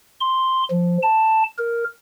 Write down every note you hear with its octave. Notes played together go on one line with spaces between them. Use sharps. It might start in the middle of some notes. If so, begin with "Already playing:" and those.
C6
F3
A5
A#4